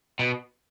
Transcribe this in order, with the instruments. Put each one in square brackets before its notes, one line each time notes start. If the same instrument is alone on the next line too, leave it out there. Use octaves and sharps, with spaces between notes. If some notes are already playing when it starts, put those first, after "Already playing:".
[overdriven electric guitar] B2